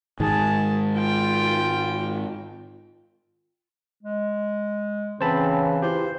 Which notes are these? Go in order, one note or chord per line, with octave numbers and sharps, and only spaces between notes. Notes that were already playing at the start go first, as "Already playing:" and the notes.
G#2 D#3 G#3 G#4 A5
F4 G5
G#3
C#3 E3 C4 C5 A5 B5
E4 F4 G4 C5